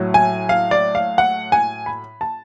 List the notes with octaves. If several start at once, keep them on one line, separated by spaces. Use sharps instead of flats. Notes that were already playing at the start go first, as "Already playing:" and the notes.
Already playing: A2 F#3
G#5
F5
D5
F5
F#5
G#5
B5
A5